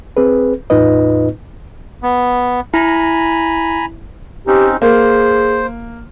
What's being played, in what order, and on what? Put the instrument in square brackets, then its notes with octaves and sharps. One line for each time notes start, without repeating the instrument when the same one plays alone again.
[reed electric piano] C4 G#4 B4
E2 A2 D#4 F4 B4 D#5
[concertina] B3
[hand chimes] E4 [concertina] G#5 A#5 B5
[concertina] C4 C#4 D#4 [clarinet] G4
[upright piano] A#3 [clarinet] G#4 [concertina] C5